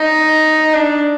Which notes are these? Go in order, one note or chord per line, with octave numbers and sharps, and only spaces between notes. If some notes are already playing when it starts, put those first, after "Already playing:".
Already playing: D#4
D4